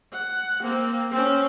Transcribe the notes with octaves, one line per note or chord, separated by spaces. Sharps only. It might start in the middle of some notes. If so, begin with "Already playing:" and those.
F#5
A#3 C4
C4 C#4